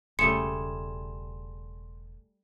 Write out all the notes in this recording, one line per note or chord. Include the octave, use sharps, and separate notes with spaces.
E1 C#3 G3 A3 G#4 C6 C#7 E7